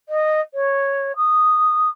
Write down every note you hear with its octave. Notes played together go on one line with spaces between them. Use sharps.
D#5
C#5
D#6